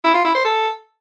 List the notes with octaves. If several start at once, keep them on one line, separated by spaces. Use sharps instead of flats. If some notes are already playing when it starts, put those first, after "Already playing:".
E4
F4
E4
C5
A4